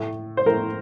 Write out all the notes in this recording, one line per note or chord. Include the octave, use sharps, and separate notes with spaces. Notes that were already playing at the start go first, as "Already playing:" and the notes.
Already playing: A2 A3
C5
A2 A3 A#4